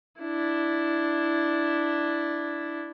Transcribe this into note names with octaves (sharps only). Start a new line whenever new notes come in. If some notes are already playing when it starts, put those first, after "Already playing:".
D4 E4